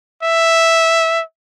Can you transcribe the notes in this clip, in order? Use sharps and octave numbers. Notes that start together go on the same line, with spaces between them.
E5